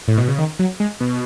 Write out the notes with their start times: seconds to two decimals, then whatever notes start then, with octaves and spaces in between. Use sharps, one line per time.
0.08 A2
0.18 B2
0.28 C#3
0.38 D#3
0.59 F#3
0.80 G#3
1.00 B2